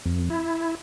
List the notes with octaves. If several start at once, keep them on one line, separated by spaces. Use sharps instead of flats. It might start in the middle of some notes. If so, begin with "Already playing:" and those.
F2
E4